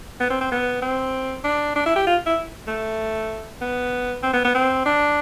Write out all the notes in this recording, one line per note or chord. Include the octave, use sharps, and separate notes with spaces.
B3
C4
C4
B3
C4
D4
D4
E4
G4
F4
E4
A3
B3
C4
B3
B3
C4
D4